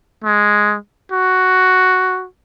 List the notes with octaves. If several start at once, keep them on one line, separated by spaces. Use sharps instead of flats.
G#3
F#4